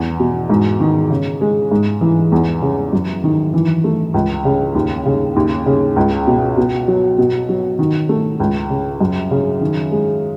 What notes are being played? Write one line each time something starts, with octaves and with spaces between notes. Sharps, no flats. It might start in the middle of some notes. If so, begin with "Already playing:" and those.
Already playing: E2
B2
G#2
D#3
C#3
G#3
G#2
E3
E2
C#3
F#2
D#3
E3
A3
C#2
C#3
D#2
C#3
D#2
C#3
C#2
B2
B2
F#3
B2
F#3
D#3
A3
C#2
C#3
F#2
C#3
D#3
G#3